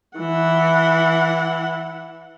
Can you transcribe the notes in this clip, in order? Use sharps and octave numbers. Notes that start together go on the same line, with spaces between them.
E3 F#5